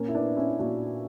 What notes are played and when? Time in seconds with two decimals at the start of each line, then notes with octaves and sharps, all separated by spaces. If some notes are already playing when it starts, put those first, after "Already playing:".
Already playing: A#2 A#3 C#4
0.08 E4
0.15 B3 D4
0.36 C#4 E4
0.59 A#2 D4 F#4